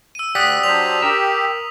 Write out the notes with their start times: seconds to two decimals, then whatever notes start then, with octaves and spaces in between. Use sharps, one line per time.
0.15 E6 D#7
0.35 D2 G4 D5 F#5 D#6 F#6 B6
0.63 F#3 D4 C5 F7
1.02 G4 A#4 E6